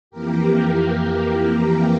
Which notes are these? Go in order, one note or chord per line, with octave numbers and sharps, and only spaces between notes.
F2 E3 A#3 G4 A#4
G4 A#4